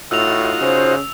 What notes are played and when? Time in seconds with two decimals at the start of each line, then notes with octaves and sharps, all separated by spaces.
0.11 A2 D#4 F4 F#4 E6 F7
0.61 C#3 C5